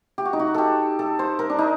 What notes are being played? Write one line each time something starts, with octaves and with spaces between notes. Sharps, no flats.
G4
F#4
D#4
F#4
G4 A4
A4
C5
A#4
D4
D#4